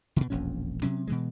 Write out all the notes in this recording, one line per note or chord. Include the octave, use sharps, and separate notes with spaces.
B2 D3
E1 A#1 F2 C#4
C3 F#3 C#4
B2 E3 G#3